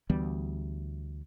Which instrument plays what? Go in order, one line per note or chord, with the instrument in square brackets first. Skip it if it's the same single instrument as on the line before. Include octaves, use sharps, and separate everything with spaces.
[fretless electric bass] D2 E3 G3 B3